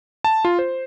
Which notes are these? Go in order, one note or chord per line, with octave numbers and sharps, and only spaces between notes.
A5
F4
C5